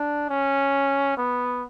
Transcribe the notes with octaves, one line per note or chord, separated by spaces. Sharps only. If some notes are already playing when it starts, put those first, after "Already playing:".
Already playing: D4
C#4
B3